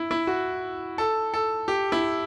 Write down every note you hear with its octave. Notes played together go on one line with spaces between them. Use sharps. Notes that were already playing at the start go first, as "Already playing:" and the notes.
Already playing: E4
E4
F#4
A4
A4
G4
E4